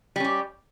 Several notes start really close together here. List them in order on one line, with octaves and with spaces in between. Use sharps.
G3 C#4 G4